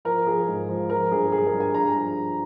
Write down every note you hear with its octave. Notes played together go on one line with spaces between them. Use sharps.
F3 A#4
F3 G#4
G#2
F3
F3 A#4
G2 G#4
G2 G#4
A#4
G2
G#5
G2 A#5
F3